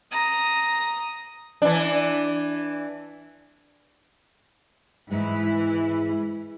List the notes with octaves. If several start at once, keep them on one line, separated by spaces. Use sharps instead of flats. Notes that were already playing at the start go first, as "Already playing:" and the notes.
A#5 D#6
E3 D4
G#2 E3 G#3 E4